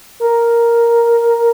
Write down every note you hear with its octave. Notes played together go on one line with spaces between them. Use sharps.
A#4